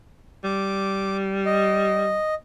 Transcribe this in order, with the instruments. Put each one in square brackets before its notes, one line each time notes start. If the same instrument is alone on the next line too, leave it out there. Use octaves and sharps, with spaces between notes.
[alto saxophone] G3 [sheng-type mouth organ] D6
[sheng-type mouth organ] D#5